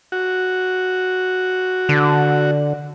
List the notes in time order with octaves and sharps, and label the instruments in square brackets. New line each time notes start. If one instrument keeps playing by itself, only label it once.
[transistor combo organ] F#4
[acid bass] D3